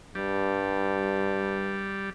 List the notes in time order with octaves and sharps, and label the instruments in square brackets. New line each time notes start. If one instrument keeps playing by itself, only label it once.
[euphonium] G2 [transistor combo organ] G3